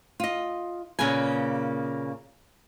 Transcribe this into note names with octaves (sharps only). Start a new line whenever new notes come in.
F4 D#5
A#2 C#3 A#3 G#4 B4 G#5